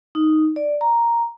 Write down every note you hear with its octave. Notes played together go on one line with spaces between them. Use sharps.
D#4
D5
A#5